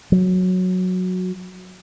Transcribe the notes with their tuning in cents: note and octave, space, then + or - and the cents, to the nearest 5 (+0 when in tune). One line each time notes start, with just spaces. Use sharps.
F#3 -10